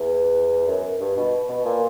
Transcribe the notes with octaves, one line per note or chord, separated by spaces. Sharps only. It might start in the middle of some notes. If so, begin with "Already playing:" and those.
Already playing: E2
F#2
G2
B2
B2
A#2